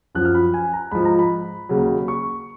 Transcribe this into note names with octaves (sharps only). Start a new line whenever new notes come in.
F#2 F3 F#6
F6
B5
G#5
A#5
G#2 F3 B5
A#5
B5
D#2 C#3 F#3
C#6